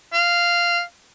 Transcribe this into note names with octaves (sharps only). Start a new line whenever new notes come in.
F5